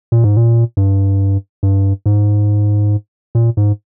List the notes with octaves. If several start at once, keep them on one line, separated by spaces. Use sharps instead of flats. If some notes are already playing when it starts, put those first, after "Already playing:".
A#2
G#2
A#2
G2
G2
G#2
A#2
G#2